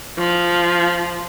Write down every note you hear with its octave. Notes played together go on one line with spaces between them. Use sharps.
F3